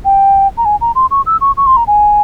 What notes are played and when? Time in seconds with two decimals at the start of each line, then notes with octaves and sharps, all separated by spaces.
0.05 G5
0.58 A#5
0.65 G#5
0.81 A#5
0.95 C6
1.11 C#6
1.26 E6
1.41 C#6
1.57 C#6
1.66 C6
1.77 A#5
1.87 G#5